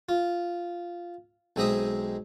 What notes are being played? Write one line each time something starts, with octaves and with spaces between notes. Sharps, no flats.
F4
B1 G#3 C4 D#5 E5 D#6